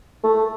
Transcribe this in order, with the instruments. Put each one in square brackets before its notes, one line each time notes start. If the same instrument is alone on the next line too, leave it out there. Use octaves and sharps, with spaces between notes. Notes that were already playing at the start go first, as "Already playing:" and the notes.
[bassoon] A3